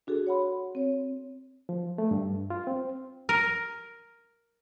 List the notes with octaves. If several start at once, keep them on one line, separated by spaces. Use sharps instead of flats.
D4 F#4 G#4 A4
C#5 F#5 B5 C6
C4 C#5
F3
A3
G2
F4
C4
A#4